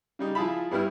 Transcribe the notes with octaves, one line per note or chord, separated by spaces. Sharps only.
C#3 G3 D#4
F3 E4 F4 G#4 A5 B5
G2 G3 B3 E4 F6